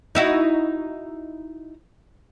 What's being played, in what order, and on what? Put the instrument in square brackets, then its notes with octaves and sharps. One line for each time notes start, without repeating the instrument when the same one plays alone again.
[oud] D#4 E4 F#4